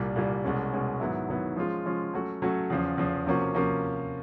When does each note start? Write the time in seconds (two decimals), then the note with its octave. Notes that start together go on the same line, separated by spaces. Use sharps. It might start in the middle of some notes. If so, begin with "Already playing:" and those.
Already playing: C2 A#2 G3
0.15 C2 A#2 G3
0.44 C2 B2 G#3 C#4
0.73 C2 B2 G#3 C#4
1.00 G#2 D#3 F#3 B3 E4
1.28 G#2 D#3 F#3 B3 E4
1.56 F3 G#3 C#4 F4
1.86 F3 G#3 C#4 F4
2.13 F#3 A3 C#4 F#4
2.42 F#3 A3 C#4 F#4
2.70 E2 C#3 F3
2.98 E2 C#3 F3
3.26 C3 F3 A#3 C#4 F#4
3.55 C3 F3 A#3 C#4 F#4